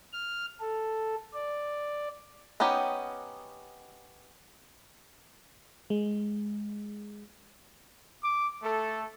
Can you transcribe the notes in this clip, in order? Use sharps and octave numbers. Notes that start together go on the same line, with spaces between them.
F6
A4
D5
B3 C#4 D#4 G4
G#3
D6
A3 A4